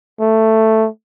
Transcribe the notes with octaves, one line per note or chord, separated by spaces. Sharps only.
A3